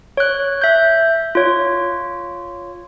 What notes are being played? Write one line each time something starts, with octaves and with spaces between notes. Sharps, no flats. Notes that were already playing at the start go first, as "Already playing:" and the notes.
C#5 F#6
E5 G6
F4 C#5